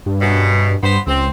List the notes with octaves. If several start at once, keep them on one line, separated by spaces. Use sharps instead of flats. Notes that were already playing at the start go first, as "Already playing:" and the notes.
G2
F#2 B2
G2 B3 C5
C#2 C4